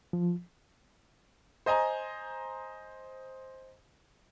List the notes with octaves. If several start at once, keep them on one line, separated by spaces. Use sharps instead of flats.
F3
C5 D#5 G#5 A#5